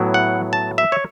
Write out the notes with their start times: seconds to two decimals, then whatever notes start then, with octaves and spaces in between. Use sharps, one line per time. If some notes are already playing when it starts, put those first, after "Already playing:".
Already playing: A2 F#3 B3 E4
0.14 F#5
0.53 A5
0.78 E5
0.92 C#5